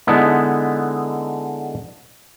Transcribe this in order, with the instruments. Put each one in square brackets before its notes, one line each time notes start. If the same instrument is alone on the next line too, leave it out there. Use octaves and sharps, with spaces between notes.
[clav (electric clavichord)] D3 G#3 B3 D#4 E4